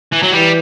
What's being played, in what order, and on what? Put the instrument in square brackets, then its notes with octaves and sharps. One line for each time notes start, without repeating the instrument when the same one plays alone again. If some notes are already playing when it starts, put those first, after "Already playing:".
[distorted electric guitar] E3
F#3
[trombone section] E3 [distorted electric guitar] G3